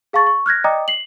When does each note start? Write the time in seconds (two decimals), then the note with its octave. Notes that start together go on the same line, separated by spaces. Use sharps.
0.13 G#4 F5 A5 C#6 A6
0.27 C#6
0.46 F6 F#6 G#6 A#6
0.64 D5 D#5 G5 A#5 D6 D#6
0.88 C7 F#7